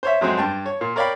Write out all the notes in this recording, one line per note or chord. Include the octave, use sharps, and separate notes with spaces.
C5 C#5 E5
F2 F#3 G#3 C4
G2 G5 A5
C#5
A#2
A#4 C#5 D5 F5 G5 B5